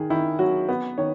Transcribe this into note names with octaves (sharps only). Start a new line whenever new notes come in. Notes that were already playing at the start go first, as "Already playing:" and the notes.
Already playing: D#3 G#4
D#3 E4
F#3 F#4
B3
D#3 C#5